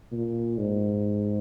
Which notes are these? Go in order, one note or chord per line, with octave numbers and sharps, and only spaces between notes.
A#2
G#2